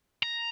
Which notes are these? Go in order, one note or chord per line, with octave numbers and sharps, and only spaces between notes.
A#5